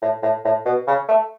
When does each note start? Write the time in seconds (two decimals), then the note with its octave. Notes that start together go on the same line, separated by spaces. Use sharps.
0.02 A2
0.23 A2
0.45 A2
0.66 B2
0.87 C#3
1.08 A3